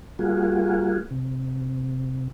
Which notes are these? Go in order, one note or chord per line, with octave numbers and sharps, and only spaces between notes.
G3 A#3 F4 F#4 G#4
C3